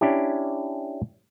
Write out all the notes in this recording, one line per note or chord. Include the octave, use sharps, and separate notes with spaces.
C#4 D4 E4 G4